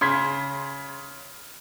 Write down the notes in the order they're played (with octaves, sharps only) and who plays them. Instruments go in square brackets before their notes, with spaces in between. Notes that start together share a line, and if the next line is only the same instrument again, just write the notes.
[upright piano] C#3 C6 G#6 B6